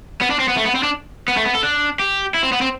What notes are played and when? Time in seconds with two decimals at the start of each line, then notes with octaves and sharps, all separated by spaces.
0.21 B3
0.31 D4
0.39 C4
0.48 B3
0.57 A3
0.65 B3
0.75 C4
0.83 D4
1.28 B3
1.37 A3
1.45 B3
1.55 A4
1.63 D4
1.99 G4
2.34 E4
2.43 C4
2.52 B3
2.61 C4